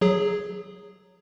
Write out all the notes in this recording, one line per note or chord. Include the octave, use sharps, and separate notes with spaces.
F#3 G#4